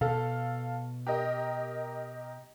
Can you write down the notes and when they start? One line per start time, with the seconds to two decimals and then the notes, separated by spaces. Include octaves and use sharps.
0.01 B2 A4 F5
1.07 G4 A#4 D#5